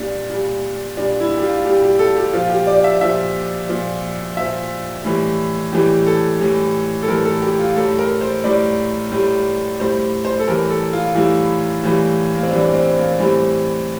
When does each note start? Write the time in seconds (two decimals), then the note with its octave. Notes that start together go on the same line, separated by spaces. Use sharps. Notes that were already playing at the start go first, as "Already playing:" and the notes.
Already playing: A#2 G3 D4
0.30 A#2 G3
0.97 A#2 G3 D4
1.20 E4
1.38 G4
1.43 F4
1.65 A#2 G3 G4
1.82 G4
1.99 A4
2.16 G4
2.33 A#2 F3 F4
2.50 G4
2.67 D5
2.84 E5
3.01 A#2 F3 E5
3.69 A#2 F3
4.37 A#2 F3 E5
5.05 A2 E3 G3
5.73 A2 E3 G3 G4
6.07 A4
6.40 A2 E3 G3
7.03 A4
7.08 A2 E3 G3 A#4
7.25 A4
7.42 G4
7.59 F4
7.76 A2 G3 A4
7.99 A#4
8.21 C5
8.44 A2 G3 D5
9.12 A2 G3
9.80 A2 G3 C5
10.25 C5
10.40 A4
10.48 A2 E3 G3 A#4
10.70 A4
10.93 F4
11.15 A2 E3 G3 E4
11.83 A2 E3 G3
12.35 A#3
12.43 C4
12.51 A2 E3 G3 D4
12.74 C4
12.97 A#3
13.19 A2 E3 G3 C4